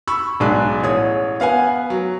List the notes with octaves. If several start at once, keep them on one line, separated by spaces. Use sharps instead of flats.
B5 C#6 E6
B1 G#3 D5 F#6
A1 C#5 D#6
B3 F5 F#5 G#5
F#3